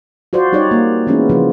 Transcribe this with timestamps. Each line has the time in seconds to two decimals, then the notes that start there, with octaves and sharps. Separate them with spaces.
0.33 F4 F#4 C5 D5
0.52 G3 D#4 G4 C#5 D5
0.71 A#3
1.07 E3 G#3 B3 C#4 E4
1.29 C#3 F3 F4